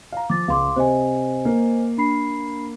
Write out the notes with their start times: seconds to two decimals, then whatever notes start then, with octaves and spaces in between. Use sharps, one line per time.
0.12 F5 A#5
0.30 F3 D6 A6
0.48 C#2 F5 C6 D6
0.76 C3 C5 D#5 G#5
1.45 A#3
1.98 D4 B5 C7